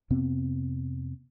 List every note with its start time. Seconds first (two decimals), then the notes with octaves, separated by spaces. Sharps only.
0.10 F2 C3 B3 C4